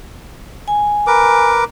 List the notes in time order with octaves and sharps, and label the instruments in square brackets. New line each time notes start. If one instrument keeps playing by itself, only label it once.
[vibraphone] G#5
[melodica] A#4 B4 D6